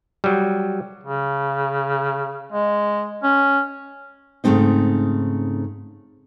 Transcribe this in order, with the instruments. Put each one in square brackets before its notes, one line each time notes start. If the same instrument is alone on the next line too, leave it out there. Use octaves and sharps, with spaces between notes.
[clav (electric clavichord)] F#3 G3
[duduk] C#3
G#3
C#4
[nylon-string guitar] G#2 C#3 E3 A3 C4 D#4